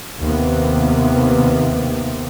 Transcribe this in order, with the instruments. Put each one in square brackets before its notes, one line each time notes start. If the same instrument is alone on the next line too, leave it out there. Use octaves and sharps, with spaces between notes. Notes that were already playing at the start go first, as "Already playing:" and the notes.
[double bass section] D#2 C3 B3